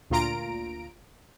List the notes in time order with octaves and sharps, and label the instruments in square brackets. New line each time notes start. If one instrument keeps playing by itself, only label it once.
[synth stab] D2 A#2 F4 A#5 D7